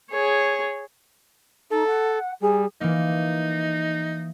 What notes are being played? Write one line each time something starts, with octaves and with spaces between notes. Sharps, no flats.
G#4 C#5
D#4 A4
F#5
G3 G#4
E3 A#3 D#4